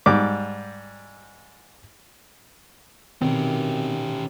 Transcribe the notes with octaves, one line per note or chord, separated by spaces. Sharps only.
G#2 G3 D6
B2 D#3 C4 C#4 G4